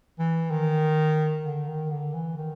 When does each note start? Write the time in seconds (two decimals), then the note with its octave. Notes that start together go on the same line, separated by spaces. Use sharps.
0.19 E3
0.51 D#3
1.44 D3
1.68 D#3
1.91 D3
2.14 E3
2.38 D#3